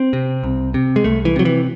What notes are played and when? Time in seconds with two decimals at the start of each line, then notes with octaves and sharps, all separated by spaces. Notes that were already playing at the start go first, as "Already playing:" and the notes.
Already playing: C4
0.13 C3
0.43 C2
0.74 C3
0.96 G#3
1.04 C2 A3
1.25 E3
1.36 C3 F#3
1.45 E3